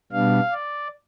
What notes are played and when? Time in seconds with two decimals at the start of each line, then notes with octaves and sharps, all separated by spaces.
0.12 B2 G3 B3 D4 F5
0.52 D5